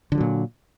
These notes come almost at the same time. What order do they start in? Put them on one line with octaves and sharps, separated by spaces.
D3 F3 F#3 A#2